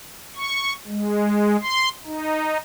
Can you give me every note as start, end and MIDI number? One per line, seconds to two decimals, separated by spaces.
0.36 0.73 85
0.87 1.57 56
1.61 1.89 84
2.05 2.57 63